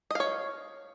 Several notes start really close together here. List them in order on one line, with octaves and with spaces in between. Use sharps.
D#5 F5 C#5